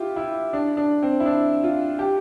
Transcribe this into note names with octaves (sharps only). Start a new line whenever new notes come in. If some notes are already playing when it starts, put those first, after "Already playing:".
Already playing: E4 F4 G4
E4
D4
D4
C4
E4
D4
F4
G4